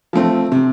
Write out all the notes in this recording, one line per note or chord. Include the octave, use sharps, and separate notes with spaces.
F3 A3 C4
C3